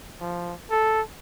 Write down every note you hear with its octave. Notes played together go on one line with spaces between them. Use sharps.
F3
A4